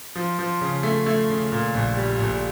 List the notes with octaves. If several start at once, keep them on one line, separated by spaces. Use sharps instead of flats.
F3
F3
C#3
A3
A3
C#3
A#2
A#1
G3
A#1